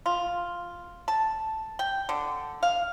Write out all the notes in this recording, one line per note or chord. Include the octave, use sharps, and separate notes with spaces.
F4
A5
G5
D3
F5